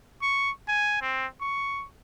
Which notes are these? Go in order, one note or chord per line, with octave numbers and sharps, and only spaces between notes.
C#6
G#5
C4
C#6